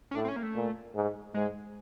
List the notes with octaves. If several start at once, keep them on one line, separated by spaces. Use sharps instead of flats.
C#4
A2 D4
C4
C#4
A#3
A3
A#2
G#2
G#2 G#3